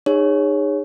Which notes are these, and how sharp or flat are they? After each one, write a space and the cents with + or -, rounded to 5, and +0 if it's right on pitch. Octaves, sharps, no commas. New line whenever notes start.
D#4 -30 G#4 -25 C#5 +0